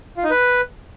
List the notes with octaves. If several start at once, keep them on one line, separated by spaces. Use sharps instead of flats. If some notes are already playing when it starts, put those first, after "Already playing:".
F4
D#4
B4